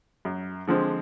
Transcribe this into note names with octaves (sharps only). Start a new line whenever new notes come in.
F#2
D3 F3 G#3 C4